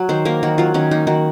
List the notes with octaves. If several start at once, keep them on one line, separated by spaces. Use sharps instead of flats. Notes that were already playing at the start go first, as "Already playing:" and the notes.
Already playing: F#3
D#3 C5
A#3 A#4
D#3 F#4
F#3 F4
D#3 C#4
A#3 D#4
D#3 F#4